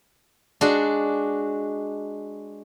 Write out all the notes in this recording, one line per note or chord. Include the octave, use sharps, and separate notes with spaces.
G#3 D4 F#4